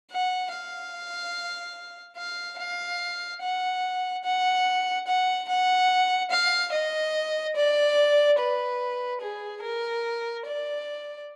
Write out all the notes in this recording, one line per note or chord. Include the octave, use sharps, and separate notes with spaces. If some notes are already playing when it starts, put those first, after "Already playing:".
F#5
F5
F5
F5
F#5
F#5
F#5
F#5
F5
D#5
D5
B4
G#4
A#4
D5